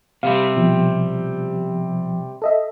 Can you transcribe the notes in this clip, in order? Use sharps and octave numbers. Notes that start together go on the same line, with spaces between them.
C3 G3 C4 F5 B5
B2 F3
A4 D#5 E5